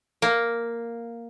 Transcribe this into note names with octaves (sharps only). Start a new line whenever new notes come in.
A#3